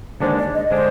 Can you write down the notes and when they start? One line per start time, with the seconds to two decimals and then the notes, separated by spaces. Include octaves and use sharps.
0.20 D#2 D3 G#3 D4 C5
0.37 D5
0.54 D#5
0.71 D3 G#3 D4 C5